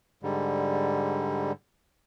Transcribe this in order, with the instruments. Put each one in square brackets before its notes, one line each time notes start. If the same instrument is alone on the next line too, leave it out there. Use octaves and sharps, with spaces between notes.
[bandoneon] G#2 D3 G3